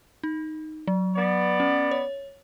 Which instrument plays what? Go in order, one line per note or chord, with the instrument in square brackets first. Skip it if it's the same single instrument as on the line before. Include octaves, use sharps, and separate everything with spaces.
[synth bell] D#4
F#3
[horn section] B3 D5
[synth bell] C#4
C#5